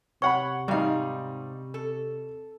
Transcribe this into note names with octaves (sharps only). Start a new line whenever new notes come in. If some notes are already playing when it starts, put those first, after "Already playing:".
C3 C#5 F#5 B5 C#6
G#2 G3 D#4 F5
A4